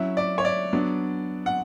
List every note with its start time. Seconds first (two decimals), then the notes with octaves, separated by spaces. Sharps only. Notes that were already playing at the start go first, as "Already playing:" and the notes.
Already playing: F#3 C#4 E4 E5
0.17 D5
0.38 C#5
0.45 D5
0.73 F#3 B3 D4
1.46 F#5